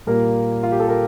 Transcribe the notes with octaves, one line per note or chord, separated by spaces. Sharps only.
A#2 G3 A#3 A#4
F4
G4
A4
A#4